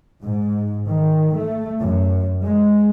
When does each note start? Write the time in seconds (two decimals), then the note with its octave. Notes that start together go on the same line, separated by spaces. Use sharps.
0.22 G#2
0.86 D#3
1.36 A3
1.81 F#2
2.42 G#3